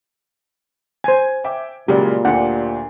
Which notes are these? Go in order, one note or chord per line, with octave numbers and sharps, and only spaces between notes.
C5 G#5 G#6
E5 G5 D6
A#2 C#3 F#3 G#3 G4 D5
D2 D4 G4 F#5